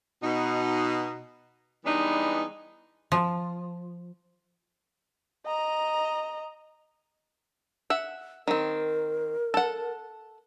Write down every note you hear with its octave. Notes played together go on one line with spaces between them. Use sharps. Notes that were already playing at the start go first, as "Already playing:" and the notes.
B2 D#4
E3 G3 G#3 B3 D4 D#4
F3
D#5 A#5
E5 F#5
D#3 C4 A#4
A4 F#5